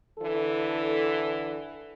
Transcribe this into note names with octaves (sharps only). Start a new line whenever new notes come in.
D3 E3 A4